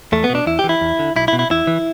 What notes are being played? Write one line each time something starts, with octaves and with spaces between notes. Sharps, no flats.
E2 A3
B3
B2
D4
E2 E4
G4
E3
E4
E2
D3
B1 E4
E4
B2
E4
E2 E4
E3